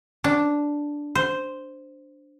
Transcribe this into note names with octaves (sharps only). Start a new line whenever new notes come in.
D4
C5